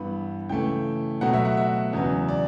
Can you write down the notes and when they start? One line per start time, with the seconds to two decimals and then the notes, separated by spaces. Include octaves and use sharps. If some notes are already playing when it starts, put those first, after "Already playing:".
Already playing: G2 E3 B3 B5
0.49 C#3 E3 A3 G5
1.21 B2 F#3 A3 F#5
1.33 E5
1.45 F#5
1.57 E5
1.93 E2 C#3 F#3 B3
2.29 D5